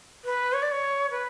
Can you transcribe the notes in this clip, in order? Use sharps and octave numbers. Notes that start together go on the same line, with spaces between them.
B4
C#5
D5
C#5
B4